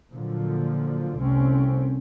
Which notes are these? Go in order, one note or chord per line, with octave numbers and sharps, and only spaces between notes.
A#2 D3 F3 F#3
F1 C2 A3 C4 C#4